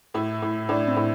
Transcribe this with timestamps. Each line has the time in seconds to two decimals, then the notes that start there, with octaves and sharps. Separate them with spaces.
0.14 A2 E4
0.42 A2
0.69 A2 D4
0.87 C4
0.96 A2